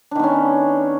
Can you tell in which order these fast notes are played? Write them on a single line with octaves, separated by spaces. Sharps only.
D4 D#3 B3 C#4